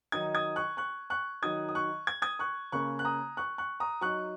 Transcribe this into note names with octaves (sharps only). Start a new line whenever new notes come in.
D#3 F#3 D#4 D#6 G#6
D#6 G#6
C#6 F#6
C#6 F#6
C#6 F#6
D#3 F#3 D#4 D#6 G#6
D#6
C#6 F#6
G#6
D#6 G#6
C#6 F#6
C#3 A#3 C#4 C#6 F#6
F#6
A#5 D#6
C#6 F#6
C#6 F#6
A#5 D#6
F#3 D#4 C#6 F#6